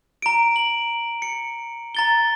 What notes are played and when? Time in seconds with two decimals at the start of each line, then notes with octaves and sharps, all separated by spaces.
0.22 A#5 D7
0.56 F#7
1.22 C#7
1.95 A#5 A6 G7